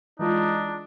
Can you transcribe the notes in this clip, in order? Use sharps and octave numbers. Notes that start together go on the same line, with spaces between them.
E3 G#3 D4 D#4 F4